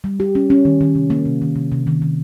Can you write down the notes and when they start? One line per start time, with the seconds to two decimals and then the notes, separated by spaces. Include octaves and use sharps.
0.04 G3
0.20 G4
0.35 C#4
0.50 C#4
0.65 D#3
0.81 D#3
0.95 C3
1.10 A#3
1.25 C3
1.42 D#3
1.56 C3
1.72 C3
1.87 D#3
2.02 D#3